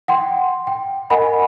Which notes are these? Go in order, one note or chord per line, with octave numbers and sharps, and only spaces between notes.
F#5 G5 C6
G5
A#4 D#5 F#5 G#5 B5